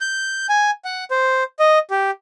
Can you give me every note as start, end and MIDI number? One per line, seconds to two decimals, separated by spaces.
0.01 0.47 91
0.49 0.71 80
0.85 1.04 78
1.11 1.44 72
1.59 1.79 75
1.90 2.11 67